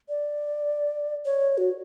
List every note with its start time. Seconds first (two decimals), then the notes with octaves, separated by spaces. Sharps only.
0.09 D5
1.25 C#5
1.58 F#4